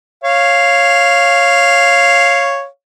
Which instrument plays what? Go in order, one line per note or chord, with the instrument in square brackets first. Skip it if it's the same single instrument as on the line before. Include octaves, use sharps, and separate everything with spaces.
[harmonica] C#5 F5